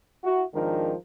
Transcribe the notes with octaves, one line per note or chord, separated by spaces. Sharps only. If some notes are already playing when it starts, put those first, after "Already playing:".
E4 F#4
G#1 D#3 F3 G#3 D4 A#4